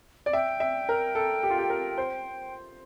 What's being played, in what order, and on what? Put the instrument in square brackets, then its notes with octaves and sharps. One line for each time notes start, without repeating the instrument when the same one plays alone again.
[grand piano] D5
[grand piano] E5 [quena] G5
[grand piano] E5
A#4
A4
G4
F4
G4
A#4
C5